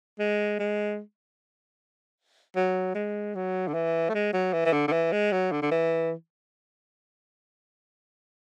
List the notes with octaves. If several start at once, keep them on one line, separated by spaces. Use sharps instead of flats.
G#3
G#3
F#3
G#3
F#3
D3
E3
A3
G#3
F#3
E3
E3
D3
D3
E3
G#3
F#3
D3
D3
E3